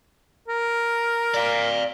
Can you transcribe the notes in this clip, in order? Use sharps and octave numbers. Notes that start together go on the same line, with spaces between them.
A#4
D5 F5